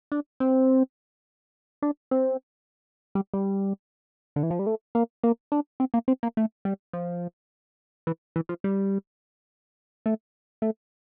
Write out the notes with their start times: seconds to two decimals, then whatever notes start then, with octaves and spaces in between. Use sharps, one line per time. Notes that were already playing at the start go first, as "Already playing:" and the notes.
0.12 D4
0.40 C4
1.82 D4
2.11 C4
3.15 G3
3.34 G3
4.36 D3
4.43 E3
4.51 F3
4.59 G3
4.67 A3
4.95 A#3
5.24 A#3
5.52 D4
5.80 C4
5.94 A#3
6.08 C4
6.23 A#3
6.37 A3
6.65 G3
6.93 F3
8.07 E3
8.36 E3
8.49 F3
8.64 G3
10.06 A3
10.62 A3